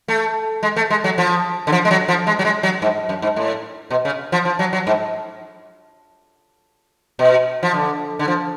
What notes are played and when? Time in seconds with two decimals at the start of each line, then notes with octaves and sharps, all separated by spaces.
0.08 A3
0.63 G#3
0.76 A3
0.90 G#3
1.04 F#3
1.18 F3
1.67 D3
1.72 F3
1.85 G#3
1.91 F#3
2.08 F3
2.27 G#3
2.39 F#3
2.45 G#3
2.63 F#3
2.82 G#2
3.09 F#2
3.22 G#2
3.36 A2
3.91 B2
4.05 C#3
4.32 F3
4.45 F3
4.59 F#3
4.73 F#3
4.87 G#2
7.19 B2
7.63 F3
7.74 D3
8.19 D3
8.28 F3